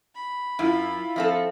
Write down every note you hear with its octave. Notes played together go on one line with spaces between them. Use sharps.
B5
F#2 E4 F4
F3 C4 A4 E5 F5